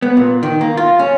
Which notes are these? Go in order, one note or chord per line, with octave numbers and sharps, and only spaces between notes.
B3
A#2
D#3
A#3
F4
C#4